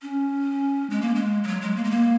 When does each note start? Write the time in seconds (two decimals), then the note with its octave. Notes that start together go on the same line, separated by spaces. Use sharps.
0.02 C#4
0.90 G#3
1.01 A#3
1.15 G#3
1.43 G#3
1.47 F#3
1.61 G#3
1.76 A#3
1.84 G#3
1.91 A#3